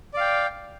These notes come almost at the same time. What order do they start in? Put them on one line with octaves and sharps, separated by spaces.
D5 F5 G5